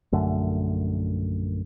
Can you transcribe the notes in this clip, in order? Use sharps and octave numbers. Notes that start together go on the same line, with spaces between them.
A#1 F#2 D3 A3